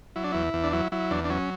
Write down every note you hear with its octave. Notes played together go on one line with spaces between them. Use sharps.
F#3 E4
D4
E2 E4
E2
D4
F#3 E4
F#3 E4
E2 D4
D4
F#3 C#4